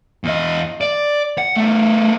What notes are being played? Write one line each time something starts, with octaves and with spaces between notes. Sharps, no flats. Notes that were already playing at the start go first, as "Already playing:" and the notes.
E2 D#5
D5
F#5
A3 B3